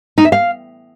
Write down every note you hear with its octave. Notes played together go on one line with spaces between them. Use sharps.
D#4
E5
F5